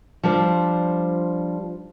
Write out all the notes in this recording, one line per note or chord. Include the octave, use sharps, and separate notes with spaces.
F3 G3 D4 C5